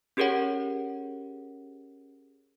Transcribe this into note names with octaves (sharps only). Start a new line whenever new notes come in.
C#4 G4 G#4 A#4 C#5 F#5